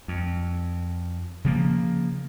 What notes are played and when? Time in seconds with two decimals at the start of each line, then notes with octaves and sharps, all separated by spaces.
0.08 F2
1.44 C#3 F3 A#3